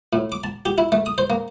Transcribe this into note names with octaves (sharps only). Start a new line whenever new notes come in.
A2
D6
A5
G4
E4
A3
D#6
C5
A#3